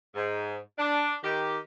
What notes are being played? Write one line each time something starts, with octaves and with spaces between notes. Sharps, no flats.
G#2
D4
D#3 G4